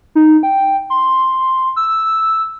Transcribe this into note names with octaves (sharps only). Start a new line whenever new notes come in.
D#4
G5
C6
E6